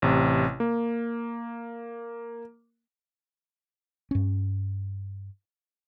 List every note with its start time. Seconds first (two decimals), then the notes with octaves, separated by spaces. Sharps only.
0.02 A1 C3
0.60 A#3
4.11 G2 C#4